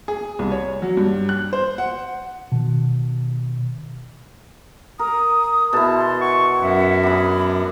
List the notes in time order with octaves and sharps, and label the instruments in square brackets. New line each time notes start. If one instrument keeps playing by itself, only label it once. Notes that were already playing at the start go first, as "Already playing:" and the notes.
[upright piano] G#4
C2
C#5
F#3
G2
F#6
C5
F#5
[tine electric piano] B2 D#3
[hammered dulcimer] A#4 [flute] D#6
[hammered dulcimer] B2 E4 [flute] G#4 [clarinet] A5
[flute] C6
[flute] F#5 [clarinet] C#6
[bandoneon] F#2 [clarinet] E5
[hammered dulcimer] D4 G#4 [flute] B5